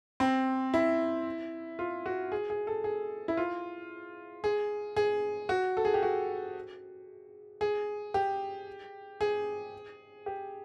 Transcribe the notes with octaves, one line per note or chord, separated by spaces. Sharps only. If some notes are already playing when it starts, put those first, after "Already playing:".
C4
E4
F4
F#4
G#4
G#4
A4
G#4
E4
F4
G#4
G#4
F#4
A4
G#4
G4
F#4
G#4
G4
G#4
G4